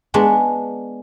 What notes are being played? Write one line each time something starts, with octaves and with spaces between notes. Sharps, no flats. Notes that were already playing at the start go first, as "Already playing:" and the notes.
G#3 B3 D4 C#5